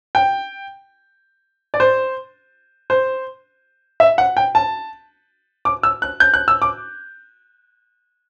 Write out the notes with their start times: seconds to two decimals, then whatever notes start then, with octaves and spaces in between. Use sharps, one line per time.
0.15 G5
1.74 D5
1.80 C5
2.90 C5
4.00 E5
4.18 F#5
4.37 G5
4.55 A5
5.65 D6
5.83 E6
6.02 F#6
6.20 G6
6.34 F#6
6.48 E6
6.62 D6